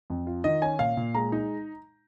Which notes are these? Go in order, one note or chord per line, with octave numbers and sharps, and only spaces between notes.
F2
F4
D#3 D#5
C#4 G#5
A#2 F5
A#2
G#3 A#5
D#4